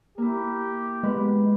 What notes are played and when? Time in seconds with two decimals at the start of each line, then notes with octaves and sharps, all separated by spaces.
0.18 A#3 E4 G4
1.03 G#3 B3 B4